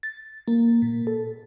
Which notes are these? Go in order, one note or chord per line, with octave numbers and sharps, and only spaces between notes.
A6
A#3
A#2
A4